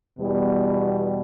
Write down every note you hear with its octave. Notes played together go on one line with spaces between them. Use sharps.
E2 B2 G3